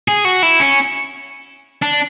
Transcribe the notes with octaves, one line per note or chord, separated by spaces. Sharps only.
G#4
F#4
E4
C#4
D4